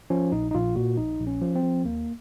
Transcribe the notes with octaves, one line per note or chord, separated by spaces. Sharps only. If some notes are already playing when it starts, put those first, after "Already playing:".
F3 C#4
A#1 D#4
D#4
A#1 F4
A#2 F#4
A#1 D#4
A#1
C#4
F3
C4
F3
D#2 A#3